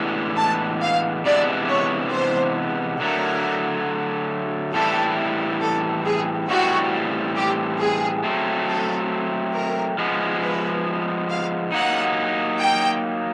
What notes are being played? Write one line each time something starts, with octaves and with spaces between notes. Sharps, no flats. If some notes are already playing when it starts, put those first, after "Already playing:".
Already playing: A2 E3 G#3 B3 D4
A5
F5
C3 E3 G#3 B3 D4 D5
C#5
C5
D3 F#3 A3 A#4
A2 E3 G3 C4 E4 A4
A4
G#4
A2 E3 G3 C4 F#4
G4
G#4
F#3 A3 C4
A4
A#4
F3 G#3 B3
B4
F5
F#3 A#3 D#4 F#5
G5